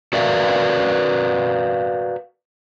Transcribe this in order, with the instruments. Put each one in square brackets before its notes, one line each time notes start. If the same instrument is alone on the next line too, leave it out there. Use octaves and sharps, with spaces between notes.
[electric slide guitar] F#4 A#4 B4 D5 E5 F5